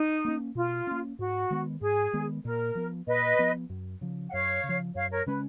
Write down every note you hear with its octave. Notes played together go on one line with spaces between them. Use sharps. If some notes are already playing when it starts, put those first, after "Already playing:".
Already playing: D#4
A#3 C#4
B2 F4
A#3 C#4
G#2 F#4
D#3 G#3 B3
G#2 G#4
D#3 G#3 B3
A#2 A#4
F3 B3
A#2 B4 D#5
F3 B3
F#2
C#3 F3
F#5
F#2 C#5 F5
C#3
F3
F#2 C#5 F5
A#4 C#5
C#3 G#3 C#4 B4